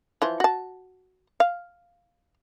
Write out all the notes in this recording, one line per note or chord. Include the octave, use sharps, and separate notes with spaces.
E3 F3 C5
F#4 A5
F5